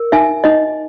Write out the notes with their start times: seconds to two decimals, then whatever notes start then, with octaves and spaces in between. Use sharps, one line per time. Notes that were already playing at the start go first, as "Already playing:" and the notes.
Already playing: A#4
0.12 D#4 E5 G#5
0.44 D#4 D#5